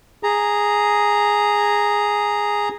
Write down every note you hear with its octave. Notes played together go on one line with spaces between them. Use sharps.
G#4 A#5